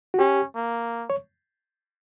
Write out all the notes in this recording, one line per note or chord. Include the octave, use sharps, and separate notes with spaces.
F#4
C#4 G4
A#3
C#5